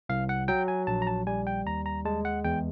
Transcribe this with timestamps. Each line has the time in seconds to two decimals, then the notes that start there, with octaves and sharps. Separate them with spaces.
0.09 C2 F5
0.29 F#5
0.48 F#3 G5
0.68 G#5
0.87 A#1 A5
1.02 A#5
1.07 A5
1.27 G3 G#5
1.47 G5
1.66 D#2 A#5
1.86 A#5
2.05 G#3 A5
2.25 F#5
2.44 E2 G5